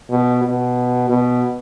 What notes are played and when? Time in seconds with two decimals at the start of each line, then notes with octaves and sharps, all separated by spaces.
0.10 B2
0.44 B2
1.09 B2